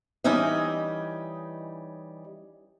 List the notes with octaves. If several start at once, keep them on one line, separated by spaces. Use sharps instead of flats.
E3 G3 C#4 D#4 D#5 E5